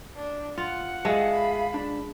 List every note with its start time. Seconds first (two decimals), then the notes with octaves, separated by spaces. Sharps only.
0.16 D4
0.58 F4 F#5
1.05 G#3 G#4 E5 F5 A5
1.35 B5
1.74 D4